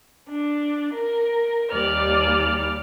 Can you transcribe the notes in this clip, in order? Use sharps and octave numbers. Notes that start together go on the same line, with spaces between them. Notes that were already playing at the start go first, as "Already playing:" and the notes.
D4
A#4
D#2 G3 D5 F6